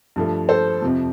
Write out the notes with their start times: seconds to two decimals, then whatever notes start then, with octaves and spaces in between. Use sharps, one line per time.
0.16 G2 F3 A3
0.49 A4 C5
0.82 F2 C3 F3